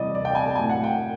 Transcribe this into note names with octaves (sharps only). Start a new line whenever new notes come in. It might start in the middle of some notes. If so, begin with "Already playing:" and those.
Already playing: C3 E3 G3 D5 D#5
D5
G5
G#5
A5
A2 F#3 G#5
F#5
G5